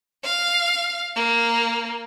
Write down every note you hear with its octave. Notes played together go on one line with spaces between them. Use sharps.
F5
A#3